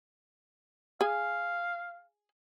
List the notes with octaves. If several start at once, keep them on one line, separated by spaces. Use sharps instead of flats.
G#4 F5 G#5